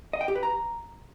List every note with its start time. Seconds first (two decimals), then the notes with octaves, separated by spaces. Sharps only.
0.13 D#5
0.21 G5
0.28 G4
0.35 B4
0.43 A#5